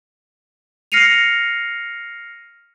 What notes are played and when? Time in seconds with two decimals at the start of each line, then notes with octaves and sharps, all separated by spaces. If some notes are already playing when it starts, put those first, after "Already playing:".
0.92 F6 A#6 C7 C#7 D#7 F7